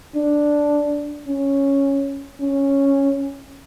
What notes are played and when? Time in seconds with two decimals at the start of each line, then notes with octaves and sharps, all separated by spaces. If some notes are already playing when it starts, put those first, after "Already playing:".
0.16 D4
1.28 C#4
2.42 C#4